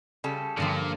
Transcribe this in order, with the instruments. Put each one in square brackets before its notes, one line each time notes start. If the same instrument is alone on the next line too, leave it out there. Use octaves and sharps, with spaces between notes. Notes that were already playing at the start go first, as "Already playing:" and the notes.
[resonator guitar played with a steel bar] C#3 G3 A4
[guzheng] G2 D3 F3 [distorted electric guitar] A#2